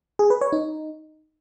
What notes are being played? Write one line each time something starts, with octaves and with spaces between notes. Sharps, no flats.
G#4
B4
C#5
D#4